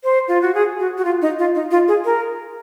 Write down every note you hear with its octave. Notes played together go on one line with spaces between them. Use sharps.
C5
F4
F#4
G#4
F#4
F#4
F4
D#4
F4
D#4
F4
G#4
A#4